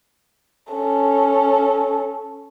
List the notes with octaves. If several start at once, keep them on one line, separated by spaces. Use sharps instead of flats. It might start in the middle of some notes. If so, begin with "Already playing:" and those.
C#4 A4